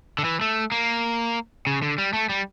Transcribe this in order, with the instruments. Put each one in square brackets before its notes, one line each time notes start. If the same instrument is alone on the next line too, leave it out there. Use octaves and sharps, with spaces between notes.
[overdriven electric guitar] D3
E3
A3
A#3
C#3
D3
G3
A3
G3